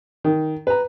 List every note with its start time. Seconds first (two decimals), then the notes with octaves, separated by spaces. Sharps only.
0.24 D#3
0.67 B4 A#5